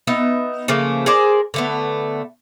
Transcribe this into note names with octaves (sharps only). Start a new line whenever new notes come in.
B3 D#4 E5
C#3 F3 A3 A#3
G#4 A#4 C5 D5
D3 A3 B3